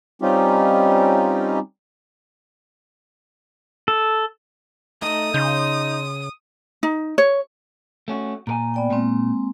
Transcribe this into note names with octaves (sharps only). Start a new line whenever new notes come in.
G3 C4 C#4 D#4 F4 G4
A4
A3 D#4 D#6
C#3 D#4 C6 G6
D#4
C#5
A3 C#4 F#4
A#2 A#4 G#5 A#5
B3 D5 G5
A#2 G#3 A#3 C4